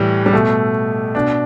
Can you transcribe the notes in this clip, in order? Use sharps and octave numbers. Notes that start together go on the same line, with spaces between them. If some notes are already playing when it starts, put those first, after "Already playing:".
Already playing: A2 E3 G3
G3
B2 A3
B2 D4